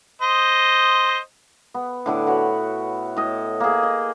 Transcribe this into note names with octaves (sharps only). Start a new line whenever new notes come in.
C5 D#5
B3
A2 D3 E4 F#5
F#4 B4 C#5
A2 D#5
A#3 G#4
D#5